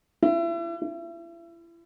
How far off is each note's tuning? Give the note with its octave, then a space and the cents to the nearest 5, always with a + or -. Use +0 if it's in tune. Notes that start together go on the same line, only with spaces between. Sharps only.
E4 +35
E4 +35